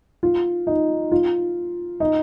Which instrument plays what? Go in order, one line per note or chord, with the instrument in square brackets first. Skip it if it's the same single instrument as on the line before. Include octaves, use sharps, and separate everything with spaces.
[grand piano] F4
D#4
F4
D#4